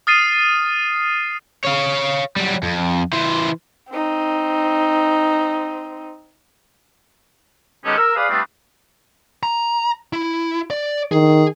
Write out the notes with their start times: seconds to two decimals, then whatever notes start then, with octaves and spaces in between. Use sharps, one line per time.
0.07 D#6 F6 A6 C7 D#7
1.64 C#5 F5
2.36 F#3 G3
2.63 F2
3.13 E3 C5
3.90 C4 D#4
7.85 D#3 G#3 B3 C#4 G4 A4
7.97 A#4 E6
8.16 G#4 B4 D5 F5
8.29 G3 A3 B3 C4 D4 F4
9.43 A#5
10.13 E4
10.70 D5
11.11 D#3 G#4